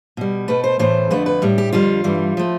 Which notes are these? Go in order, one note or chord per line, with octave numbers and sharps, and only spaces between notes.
B2 G3
B2 A3 B4
C5
A2 E3 A3 C5
F2 D3 A3 B4
B4
A2 G3
G4
F2 D3 G3 F4
G2 E3 G3
F3 A3